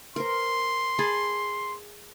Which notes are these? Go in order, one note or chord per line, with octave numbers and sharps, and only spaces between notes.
A#4 C5 C6
G#4 A5 B5